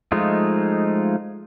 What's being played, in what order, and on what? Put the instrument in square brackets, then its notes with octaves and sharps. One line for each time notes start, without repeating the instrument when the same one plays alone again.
[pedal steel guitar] F3 G#3 A3 D#4 F4